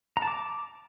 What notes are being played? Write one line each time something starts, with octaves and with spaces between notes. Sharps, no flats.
A#5
A5
D6